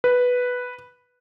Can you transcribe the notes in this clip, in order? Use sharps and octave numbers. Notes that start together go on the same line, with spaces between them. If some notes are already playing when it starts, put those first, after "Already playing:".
B4